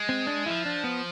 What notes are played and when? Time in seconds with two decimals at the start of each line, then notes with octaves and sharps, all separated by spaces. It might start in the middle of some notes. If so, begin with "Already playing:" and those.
Already playing: G#3
0.09 C4
0.27 D4
0.46 F3 E4
0.66 D4
0.84 B3